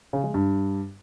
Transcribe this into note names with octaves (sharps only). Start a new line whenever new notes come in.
C#3
G#3
G2